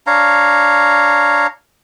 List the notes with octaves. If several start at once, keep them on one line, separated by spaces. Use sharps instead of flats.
D4 C#5 F5 A#5